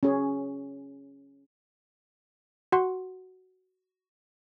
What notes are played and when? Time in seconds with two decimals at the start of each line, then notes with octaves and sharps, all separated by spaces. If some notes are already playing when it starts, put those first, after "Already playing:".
0.03 C#4 G#4
2.72 F#4 F#5 C6